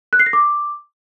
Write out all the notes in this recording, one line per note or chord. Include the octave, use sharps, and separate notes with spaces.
F#6
C7
A#6
D6